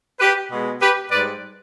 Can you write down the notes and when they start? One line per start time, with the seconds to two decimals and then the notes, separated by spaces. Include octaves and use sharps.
0.20 G4 B4
0.51 B2 G#3
0.81 G4 B4
1.11 G#2 G3 B4 D5